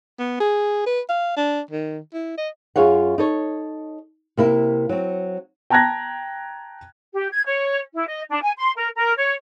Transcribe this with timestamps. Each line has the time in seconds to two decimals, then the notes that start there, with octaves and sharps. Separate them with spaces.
0.19 B3
0.40 G#4
0.86 B4
1.09 F5
1.37 D4
1.71 D#3
2.14 E4
2.38 D#5
2.76 F#2 F4 G#4 C#5 F5 F#5
3.18 D#4 A4 C#5
4.37 C3 A#3 E4
4.89 F#3 C4
5.70 G5 A5 A#5 F#6 G#6 A#6
7.14 G4
7.32 G#6
7.46 C#5
7.94 E4
8.07 D#5
8.30 D4
8.42 G#5
8.57 C6
8.75 A#4
8.97 A#4
9.17 C#5